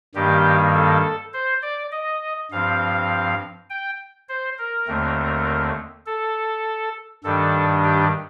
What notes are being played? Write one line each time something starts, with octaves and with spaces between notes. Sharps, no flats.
G2 D#3 G3 A#3 G4
A4
C5
D5
D#5
G2 F3 C4 F5
G5
C5
A#4
D#2 D3 A3 C4
A4
G2 D#3 G3 D4 A4
G4